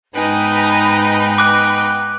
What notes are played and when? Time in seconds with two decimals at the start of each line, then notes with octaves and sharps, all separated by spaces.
0.15 G#2 B3 D#4 B4 G5 G#5 B5
1.38 D6 F#6